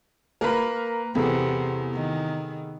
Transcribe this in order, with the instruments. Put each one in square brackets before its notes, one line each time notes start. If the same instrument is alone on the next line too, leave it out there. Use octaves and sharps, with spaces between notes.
[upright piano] A#3 [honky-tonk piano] A#4 B4 B5
[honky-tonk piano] E2 [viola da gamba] C3 [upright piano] B3 G#4 A4
[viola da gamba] D#3